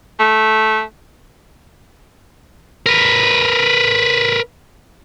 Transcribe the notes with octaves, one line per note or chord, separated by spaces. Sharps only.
A3
A#4 B4